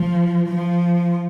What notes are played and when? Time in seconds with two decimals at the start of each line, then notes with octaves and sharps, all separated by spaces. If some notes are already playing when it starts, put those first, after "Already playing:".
Already playing: F3
0.49 F3